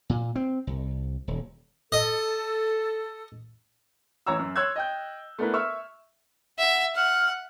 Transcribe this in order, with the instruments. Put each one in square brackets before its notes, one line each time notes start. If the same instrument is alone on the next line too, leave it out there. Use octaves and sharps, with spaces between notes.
[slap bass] A#2
C4
C2
D#1
[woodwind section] A4 [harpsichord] D#5
[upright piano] A1 E3 C#5 A#5 E6
F#2
C#5 C6 E6 F#6 G#6
D#5 G5 G6
A3 B3 D4 E4 A#4 B4
E5 C#6 E6 F6
[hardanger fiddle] E5 [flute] F#5
[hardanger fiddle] F#5 [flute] F6